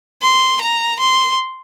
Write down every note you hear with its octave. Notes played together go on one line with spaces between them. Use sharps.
C6
A#5
C6